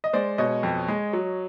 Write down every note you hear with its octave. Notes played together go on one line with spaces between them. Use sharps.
D#5
G#3 C5 D5
B2 C#5 D#5
F2
G#3
F#3